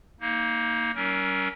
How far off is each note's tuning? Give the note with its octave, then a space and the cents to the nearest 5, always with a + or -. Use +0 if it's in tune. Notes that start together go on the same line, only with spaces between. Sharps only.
A#3 +0 D#4 +30
F#3 +45 C#4 +15 A#4 +10